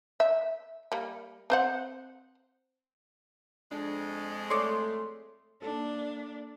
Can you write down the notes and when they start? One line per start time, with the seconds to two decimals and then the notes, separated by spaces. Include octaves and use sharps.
0.20 E5
0.92 G3 A#3
1.50 C4 C5 F#5
3.72 F2 G#3 D4
4.50 A3 C#5 D5 C6
5.62 A#3 D4 A4